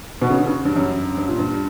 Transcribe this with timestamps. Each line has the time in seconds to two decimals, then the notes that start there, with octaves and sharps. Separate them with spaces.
0.22 B2
0.30 C#3
0.38 D3
0.46 C#3
0.65 G2
0.76 F#2
1.18 G2
1.28 A#2
1.39 G2